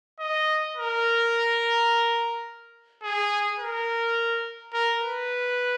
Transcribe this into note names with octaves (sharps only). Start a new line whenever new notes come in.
D#5
A#4
G#4
A#4
A#4
B4